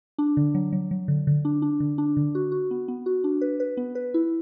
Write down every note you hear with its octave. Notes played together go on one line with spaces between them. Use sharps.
D4
D3
F#3
F#3
F#3
D3
D3
D4
D4
D3
D4
D3
F#4
F#4
B3
B3
F#4
D4
B4
B4
B3
B4
E4